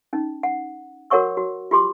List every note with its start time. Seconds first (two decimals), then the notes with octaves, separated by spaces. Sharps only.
0.13 C#4 D#4
0.43 F#5
1.10 F#4 A#4 C#5 F#5 C#6 E6
1.37 F#4
1.71 F4 G4 C6 D6